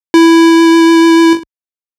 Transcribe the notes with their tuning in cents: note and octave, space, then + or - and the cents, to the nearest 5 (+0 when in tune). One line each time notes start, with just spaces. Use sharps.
E4 +5